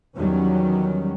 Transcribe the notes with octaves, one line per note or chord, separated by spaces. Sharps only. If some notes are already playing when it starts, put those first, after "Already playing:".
E2 D#3 F#3 G3 C#4